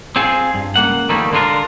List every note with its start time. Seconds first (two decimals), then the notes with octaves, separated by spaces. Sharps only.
0.16 C4 F4 G#4
0.54 G2
0.76 C#2 A#3 F#5
1.09 D#3 F3 G3 A3 A#3
1.33 D3 G#3 D4 F4 A#4